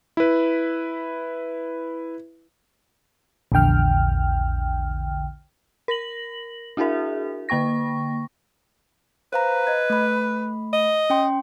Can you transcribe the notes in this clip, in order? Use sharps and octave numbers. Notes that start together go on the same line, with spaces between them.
E4 B4
A#1 E2 D3 G5 F6
A#4 A#6 F#7
D4 E4 F#4 G#4 A#4 E5
D3 A#3 G5 C#6 A#6
B4 C5 F5 A#5
D#5 G#6
A3 B5
D#5
C#4 G5 C6